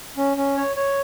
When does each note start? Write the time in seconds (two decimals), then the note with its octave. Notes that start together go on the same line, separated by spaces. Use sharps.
0.17 C#4
0.37 C#4
0.57 C#5
0.76 C#5